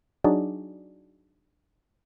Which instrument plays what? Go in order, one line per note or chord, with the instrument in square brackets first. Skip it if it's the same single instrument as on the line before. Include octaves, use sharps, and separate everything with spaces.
[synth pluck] F#3 D4 D#4 F#4 G#4 D5